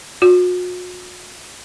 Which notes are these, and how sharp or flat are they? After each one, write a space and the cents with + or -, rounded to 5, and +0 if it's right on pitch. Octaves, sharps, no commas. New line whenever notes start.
F#4 -40